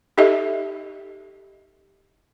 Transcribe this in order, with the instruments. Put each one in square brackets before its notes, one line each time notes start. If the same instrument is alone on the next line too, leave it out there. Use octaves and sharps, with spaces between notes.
[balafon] D#4 G4 A4 D#5 E5